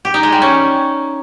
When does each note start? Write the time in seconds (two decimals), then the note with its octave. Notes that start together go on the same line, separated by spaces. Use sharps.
0.05 G4
0.14 D#4
0.23 G#3
0.32 G3
0.42 C#4